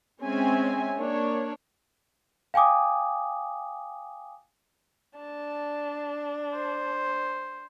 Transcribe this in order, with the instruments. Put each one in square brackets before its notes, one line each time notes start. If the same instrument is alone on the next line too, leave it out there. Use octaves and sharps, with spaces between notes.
[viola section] G#3 C4 C#4 C#5 E5 G#5
A#3 D4 C#5
[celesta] F5 G5 G#5 D6 D#6
[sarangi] D4 [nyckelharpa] A5
[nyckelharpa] C5